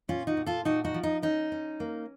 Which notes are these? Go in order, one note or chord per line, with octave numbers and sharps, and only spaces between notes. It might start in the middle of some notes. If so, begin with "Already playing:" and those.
A#2 C#4 F4
D#4 F#4
A#2
F4 A4
A#2 D#4 F#4
D#4 F#4
F3
D#4
C#4 D#4
C#4
A#3